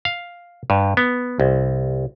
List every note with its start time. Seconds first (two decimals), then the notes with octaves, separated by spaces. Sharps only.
0.05 F5
0.70 G2
0.97 B3
1.40 C2